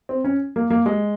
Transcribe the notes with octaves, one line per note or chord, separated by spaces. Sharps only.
C4
C#4
A#3
A#3
G#3